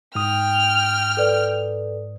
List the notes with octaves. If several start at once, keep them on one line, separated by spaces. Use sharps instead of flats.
G#2 G5 D#6 F6
A4 B4 D5